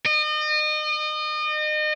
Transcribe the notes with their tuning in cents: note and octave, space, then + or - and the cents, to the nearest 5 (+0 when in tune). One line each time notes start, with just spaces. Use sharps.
D#5 -35